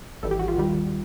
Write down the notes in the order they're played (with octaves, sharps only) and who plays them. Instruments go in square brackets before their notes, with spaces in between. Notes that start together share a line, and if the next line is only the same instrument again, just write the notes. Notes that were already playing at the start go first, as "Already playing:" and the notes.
[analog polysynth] G#1 G#2 E3 G3 A4
G4
F#4
F4
D#2 D#3 G3